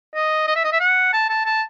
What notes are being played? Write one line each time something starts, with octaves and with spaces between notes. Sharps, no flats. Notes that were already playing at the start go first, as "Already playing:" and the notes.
D#5
D#5
E5
D#5
E5
F#5
A5
A5
A5